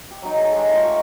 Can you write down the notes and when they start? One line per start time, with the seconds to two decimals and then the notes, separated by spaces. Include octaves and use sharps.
0.11 G4
0.22 F#3 D#4
0.36 G#4
0.52 G#3 G4 A4
0.68 A3 D#4 F4
0.83 D#4 G4 C#6